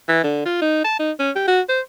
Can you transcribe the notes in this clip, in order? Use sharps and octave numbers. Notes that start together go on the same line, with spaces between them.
E3
D3
F4
D#4
A5
D#4
C#4
G4
F#4
C5